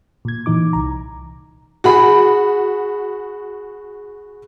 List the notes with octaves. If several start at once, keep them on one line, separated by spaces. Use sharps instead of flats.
A#2 G#6
A#2 E3 D#4 D6
C2 A#5
F#4 G#4 B5